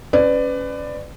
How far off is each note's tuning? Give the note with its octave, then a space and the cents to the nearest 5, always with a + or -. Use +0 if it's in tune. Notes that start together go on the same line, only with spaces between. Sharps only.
C#4 +0 B4 +25 D5 +15